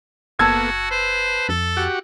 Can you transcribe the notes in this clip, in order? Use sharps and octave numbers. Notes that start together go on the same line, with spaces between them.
F#1 A#3 B3 F#4 A4 A5 E6 G#6
B4 C5
F2 A4
F#4 G4 F#5